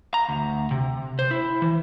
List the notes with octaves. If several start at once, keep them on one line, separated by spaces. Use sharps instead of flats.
A#5
D2
C3
C5
E4
E3